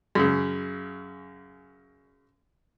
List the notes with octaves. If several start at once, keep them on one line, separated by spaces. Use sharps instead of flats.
F#2 C#3